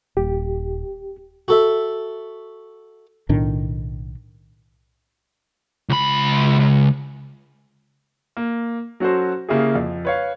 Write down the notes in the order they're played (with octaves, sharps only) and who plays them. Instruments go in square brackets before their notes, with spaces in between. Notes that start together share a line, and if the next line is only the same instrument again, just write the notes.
[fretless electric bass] D#1 [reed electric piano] G4
[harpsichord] F#4 A4 E5
[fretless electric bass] B1 A2 D#3 D4
[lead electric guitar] C#2 B5
[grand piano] A#3
F#3 C#4 F#4 A4 C5
C#3 A#3 E4 G4 G#4
F2
B4 C#5 F5